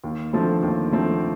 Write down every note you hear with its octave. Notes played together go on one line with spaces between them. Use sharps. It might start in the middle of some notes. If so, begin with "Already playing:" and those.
D#2
D3 F3 A3 C4
D#2
D3 F3 A3 C4